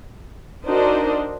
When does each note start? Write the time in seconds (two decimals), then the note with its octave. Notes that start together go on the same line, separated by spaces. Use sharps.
0.66 D4 D#4 F#4 A#4 C5 D#5